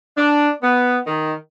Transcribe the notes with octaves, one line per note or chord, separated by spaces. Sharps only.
D4
B3
D#3